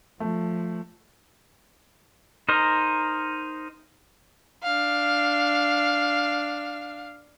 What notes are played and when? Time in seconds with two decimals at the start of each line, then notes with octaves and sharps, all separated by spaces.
0.20 F3 A3
2.49 D#4 A#4 C5 D#5
4.63 D4 F5